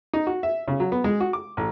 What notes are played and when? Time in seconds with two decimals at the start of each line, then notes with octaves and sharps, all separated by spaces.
0.13 D#4
0.27 F#4
0.43 E5
0.68 C#3
0.80 F#3
0.92 B3
1.04 G#3
1.20 F#4
1.33 D6
1.57 A1